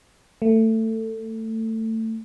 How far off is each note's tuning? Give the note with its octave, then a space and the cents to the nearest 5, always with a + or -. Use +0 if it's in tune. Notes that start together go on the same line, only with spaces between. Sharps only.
A3 +20